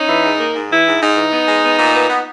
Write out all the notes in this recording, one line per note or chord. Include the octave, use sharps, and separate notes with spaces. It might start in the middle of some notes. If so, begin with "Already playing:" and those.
Already playing: C#4 D#4
E3
G#2
A#3
G#2
E3 E4
G#2
G#2 D#4
E3
B3
G#3
B3
A#2
B3
B3